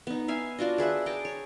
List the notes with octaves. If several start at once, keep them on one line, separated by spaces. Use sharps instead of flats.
B3 D#4
E5 F5 G#5
D4 F4 F#4 D#5
G#4 B4 E5 F#5
G#4 G5 A5 A#5
C#5